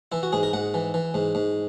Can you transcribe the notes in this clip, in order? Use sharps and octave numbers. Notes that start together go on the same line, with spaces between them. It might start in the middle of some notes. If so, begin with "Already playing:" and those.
E3 E4
F#4
G#2 G#4
A#4
G#2 F#5
E3
E3
G#2
G#2